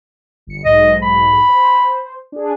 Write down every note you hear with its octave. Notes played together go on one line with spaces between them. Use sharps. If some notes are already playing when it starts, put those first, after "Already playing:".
G1 C#7
B1 G#2 D#5
B5
C5
D4 G#4